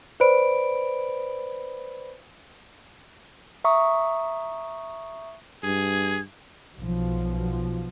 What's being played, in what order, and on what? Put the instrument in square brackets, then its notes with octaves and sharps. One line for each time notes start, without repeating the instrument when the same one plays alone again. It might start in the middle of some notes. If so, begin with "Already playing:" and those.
[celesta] B4 C5 D5 B5 D7
[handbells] E5 A#5 C#6 D#6
[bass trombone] G2 [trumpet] G#4 [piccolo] G#6
[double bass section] B1 B2 F3